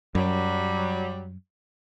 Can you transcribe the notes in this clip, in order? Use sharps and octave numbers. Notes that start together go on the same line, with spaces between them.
F#2 F#3 G3